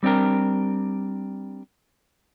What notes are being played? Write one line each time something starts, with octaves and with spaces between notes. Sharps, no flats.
G3 C4 D4 G4 A#4